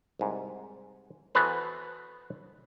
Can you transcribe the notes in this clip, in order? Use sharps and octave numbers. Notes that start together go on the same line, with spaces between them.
C2 G#2
E3 B3 F#4 A4 B4 C5